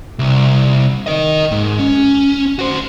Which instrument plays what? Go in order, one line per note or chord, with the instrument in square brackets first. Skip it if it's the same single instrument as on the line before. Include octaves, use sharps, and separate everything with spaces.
[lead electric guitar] C2
A#4 D#5
G#2
C#4
F#4 C5